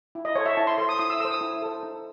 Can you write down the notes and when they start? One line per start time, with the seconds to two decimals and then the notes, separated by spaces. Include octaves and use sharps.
0.15 E4
0.25 D#5
0.35 A4 C5 C#5
0.46 E5
0.57 E4 A5
0.67 C6
0.78 A4 C5 C6
0.89 D#6
0.99 E4 D#6
1.10 E6
1.20 A4 C5 E6
1.31 D#6
1.41 E4
1.62 A4 C5
1.83 D#4